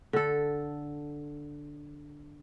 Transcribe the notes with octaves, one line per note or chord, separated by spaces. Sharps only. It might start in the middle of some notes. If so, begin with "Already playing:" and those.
D3 A4